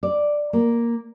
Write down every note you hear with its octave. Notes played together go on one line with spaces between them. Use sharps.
D5
A#3